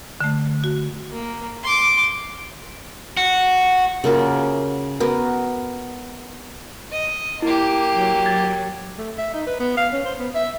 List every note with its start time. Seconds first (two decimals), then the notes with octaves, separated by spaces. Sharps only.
0.21 D3 A3
0.64 F#4
1.11 A#3
1.64 C6 D6
3.17 F#4
4.04 C#3 A#3 F4 F#4
5.00 B3 F#4 A#4
6.92 D#5
7.42 A#3 E4 G4
7.93 F#3
8.26 G#6 A6
8.98 A3
9.18 E5
9.34 D#4
9.47 B4
9.60 B3
9.77 F5
9.93 C#4
10.05 C5
10.19 B3
10.35 E5